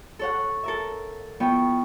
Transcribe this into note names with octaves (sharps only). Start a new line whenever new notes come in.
A4 C#5 F#5
A4 A#4 E5
F2 B3 E4 G5 C#6